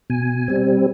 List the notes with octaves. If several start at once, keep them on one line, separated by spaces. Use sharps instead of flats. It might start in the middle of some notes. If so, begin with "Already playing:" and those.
B2 G#5
G3 C4